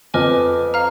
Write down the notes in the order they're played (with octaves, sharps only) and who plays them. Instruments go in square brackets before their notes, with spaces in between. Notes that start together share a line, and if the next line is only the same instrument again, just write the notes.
[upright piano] F2 [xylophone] B4 D#5 G#5 D6 F6
[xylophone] F5 A#5 F6